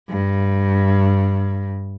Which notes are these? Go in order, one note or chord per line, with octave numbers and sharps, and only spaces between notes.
G2